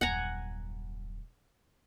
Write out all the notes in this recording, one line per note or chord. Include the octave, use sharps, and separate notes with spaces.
D#1 F#2 F#5 G#5 A#5